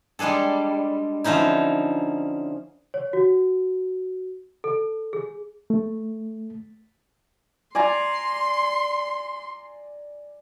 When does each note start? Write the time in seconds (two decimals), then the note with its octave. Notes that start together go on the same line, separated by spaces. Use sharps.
0.19 G3 G#3 D4 G#4 A4
1.24 D3 F3 C#4 D#4 E4
2.94 C#5
3.13 F#4
4.64 A4
5.13 G#4
5.70 A3
7.75 D5 G#5 A#5 C6